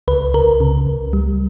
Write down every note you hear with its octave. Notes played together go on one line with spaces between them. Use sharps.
C#2 B4
C#2 A#4
C#3
C#2
G3